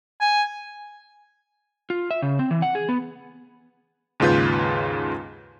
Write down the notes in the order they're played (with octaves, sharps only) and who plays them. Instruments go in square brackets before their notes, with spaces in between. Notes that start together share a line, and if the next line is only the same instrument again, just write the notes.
[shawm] G#5
[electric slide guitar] F4
E5
C#3
C4
E3
F#5
G#4
B3
[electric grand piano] D#2 G#2 C#3 F4 B4 G6